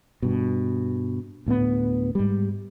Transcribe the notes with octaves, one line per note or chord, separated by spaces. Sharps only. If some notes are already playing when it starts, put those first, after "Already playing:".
G2 B2
D2 A2 G#3 B3
G#2 G3